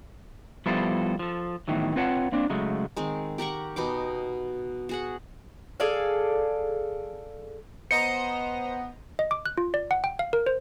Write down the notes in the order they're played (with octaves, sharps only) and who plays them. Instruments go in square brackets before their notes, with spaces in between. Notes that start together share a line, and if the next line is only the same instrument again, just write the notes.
[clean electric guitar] F3 G3 B3 E4 A4 C5
F3 A4
E2 A2 D#3 E3 F#3
C4 F4 B4 C#5 F#5 A5
A#3 C4 D4
C#3 F#3 G#3 A3
[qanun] D#3 G#3 C4
G4 A#4 F#5 C#6
B2 B3 D#4 D6
F#4 G#4 F#5
[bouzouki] G#4 A4 D5 F5
[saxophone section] B3 [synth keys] C5 D#5 A#5 [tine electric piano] C#7
[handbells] D#5
D6
F#6
F4
D5
F#5
G5
F5
A#4
C5